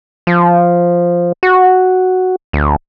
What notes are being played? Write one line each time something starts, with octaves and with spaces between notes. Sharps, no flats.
F3
F#4
D2